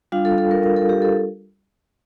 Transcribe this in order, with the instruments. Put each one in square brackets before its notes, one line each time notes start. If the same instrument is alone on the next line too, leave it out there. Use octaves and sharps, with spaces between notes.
[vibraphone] G3 D4 F4 F5
A4
A4
A#4
A#4
A4
G4
A4